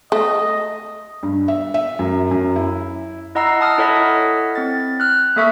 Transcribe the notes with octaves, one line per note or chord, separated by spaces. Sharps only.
A3 D#5
G2
E5
E5
F#2
F#2
E4
E4 D#5 F#5 A#5 E6 C7
A5 D#6 F6
E4 A4 C#5 D#5 F#5 B6
C4 A6
F6 F#6
A#3 A4 E5 C#6 B6